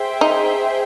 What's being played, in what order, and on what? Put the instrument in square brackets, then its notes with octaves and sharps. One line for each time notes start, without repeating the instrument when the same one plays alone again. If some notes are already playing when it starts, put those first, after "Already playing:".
Already playing: [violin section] G#4 C5 E5 G5
[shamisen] D#4